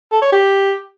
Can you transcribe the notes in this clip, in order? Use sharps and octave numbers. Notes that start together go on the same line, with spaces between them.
A4
C#5
G4